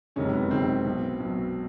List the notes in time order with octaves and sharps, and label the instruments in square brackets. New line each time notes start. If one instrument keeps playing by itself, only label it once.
[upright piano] F#1 F2 C3 D#3 G#3 [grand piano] C#4
[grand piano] B3
[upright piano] F#1 F2 C3 D#3 G#3 [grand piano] C4
[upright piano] B1 B2 F#3
B1 B2 F#3